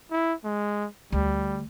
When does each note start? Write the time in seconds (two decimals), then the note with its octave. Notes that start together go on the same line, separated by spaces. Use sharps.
0.11 E4
0.44 G#3
1.12 D2 G3